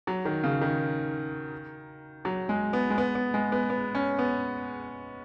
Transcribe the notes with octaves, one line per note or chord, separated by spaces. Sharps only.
F#3
D#3
C#3
D#3
F#3
G#3
B3
G#3
B3
B3
G#3
B3
B3
C#4
B3